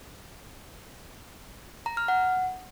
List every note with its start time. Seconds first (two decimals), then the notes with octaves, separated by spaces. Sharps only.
1.86 A#5
1.97 F6
2.08 F#5